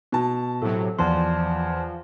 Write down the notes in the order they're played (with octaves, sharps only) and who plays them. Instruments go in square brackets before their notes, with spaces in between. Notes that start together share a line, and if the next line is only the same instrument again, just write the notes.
[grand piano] B2 A5
[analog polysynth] A2 C3 F#3 [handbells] A4
[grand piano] E2 [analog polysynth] F3 [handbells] D5 A5 C6